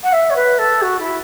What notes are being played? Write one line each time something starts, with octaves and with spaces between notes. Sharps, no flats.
F#5
E5
C#5
B4
A4
F#4
E4